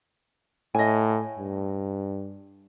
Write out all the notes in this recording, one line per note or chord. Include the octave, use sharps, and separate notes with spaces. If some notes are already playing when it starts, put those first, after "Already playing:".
A2 D#5 G#5
G2